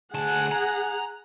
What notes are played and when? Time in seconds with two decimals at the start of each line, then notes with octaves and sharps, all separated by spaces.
0.14 D2 G#4 F#5 A5
0.51 A#5